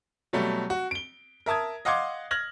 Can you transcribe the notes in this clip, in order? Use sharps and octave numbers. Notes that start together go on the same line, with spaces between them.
B2 F#3 G3 A3
F#4
D7 G7
A#4 E5 A5 D#6 G#6
D#5 F5 F#5 C6 D6 G#6
F6 G#6 A#6 F#7